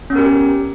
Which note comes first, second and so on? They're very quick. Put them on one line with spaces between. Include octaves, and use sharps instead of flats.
C#4 B3 A#4 G4